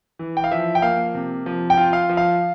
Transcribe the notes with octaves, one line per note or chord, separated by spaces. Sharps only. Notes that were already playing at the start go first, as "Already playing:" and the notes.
E3
G5
F5
F3 E5
G5
A#3 F5
C3
F3
G5
F4
F5
F3
F5